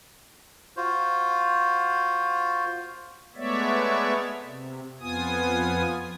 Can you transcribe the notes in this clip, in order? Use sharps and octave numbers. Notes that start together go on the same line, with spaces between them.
F4 F#4 C5
G#3 A3 B3 C#5 D5 E5
C3
F2 B3 F4 G#5 D#6